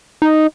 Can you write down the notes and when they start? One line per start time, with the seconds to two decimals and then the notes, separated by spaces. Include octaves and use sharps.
0.22 D#4